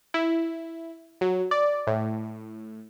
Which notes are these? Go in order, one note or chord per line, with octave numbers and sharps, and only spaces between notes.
E4
F#3
D5
A2